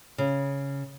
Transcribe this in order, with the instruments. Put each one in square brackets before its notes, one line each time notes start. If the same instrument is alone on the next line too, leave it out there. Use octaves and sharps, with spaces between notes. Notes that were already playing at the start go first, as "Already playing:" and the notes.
[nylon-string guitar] C#3